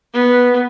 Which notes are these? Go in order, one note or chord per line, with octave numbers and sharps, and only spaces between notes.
B3